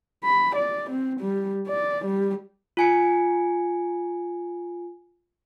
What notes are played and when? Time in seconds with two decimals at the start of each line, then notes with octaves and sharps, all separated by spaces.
0.24 B5
0.55 D5
0.90 C4
1.20 G3
1.68 D5
2.05 G3
2.77 F4 G#5 C#7